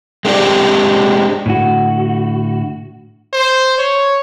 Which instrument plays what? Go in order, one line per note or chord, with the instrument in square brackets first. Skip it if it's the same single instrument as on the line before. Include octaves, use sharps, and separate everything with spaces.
[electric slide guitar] G#3 A#3 C4 D4 G4 D5
A2 D3 F#4
[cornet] C5
C#5